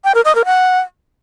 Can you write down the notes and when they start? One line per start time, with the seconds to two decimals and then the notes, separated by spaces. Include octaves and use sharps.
0.04 G5
0.15 A#4
0.25 D#5
0.35 A#4
0.45 F#5